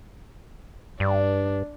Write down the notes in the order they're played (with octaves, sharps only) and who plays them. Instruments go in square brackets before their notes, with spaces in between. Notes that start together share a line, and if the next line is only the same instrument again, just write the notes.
[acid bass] G2 [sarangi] D4